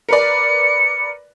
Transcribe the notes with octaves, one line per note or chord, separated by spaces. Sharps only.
A#4 B4 D5 C#7